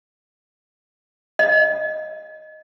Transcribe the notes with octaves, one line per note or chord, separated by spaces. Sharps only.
D#5